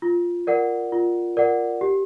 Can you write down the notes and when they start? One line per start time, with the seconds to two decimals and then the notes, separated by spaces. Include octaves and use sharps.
0.02 F4
0.47 A#4 D5 F#5
0.92 F4
1.37 A#4 D5 F#5
1.81 G4